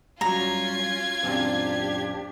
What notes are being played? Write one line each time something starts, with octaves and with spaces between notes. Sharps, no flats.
G2 F#3 C#4 F4 A#5 G#6
F#2 A#2 C4 D4 G4